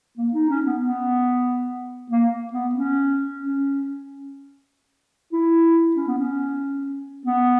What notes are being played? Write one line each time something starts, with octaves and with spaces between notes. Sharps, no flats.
A#3
D#4
C#4
B3
B3
A#3
B3
C#4
C#4
E4
C#4
B3
C#4
B3